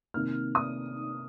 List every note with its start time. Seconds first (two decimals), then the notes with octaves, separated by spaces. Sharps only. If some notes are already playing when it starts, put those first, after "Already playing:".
0.14 C3 D#3 A#3 F6
0.55 D#6